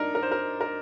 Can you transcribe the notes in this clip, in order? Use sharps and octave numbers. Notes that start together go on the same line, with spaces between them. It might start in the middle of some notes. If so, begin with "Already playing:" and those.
Already playing: D4 D#4 A#4
A#4
C5
A#4
A#4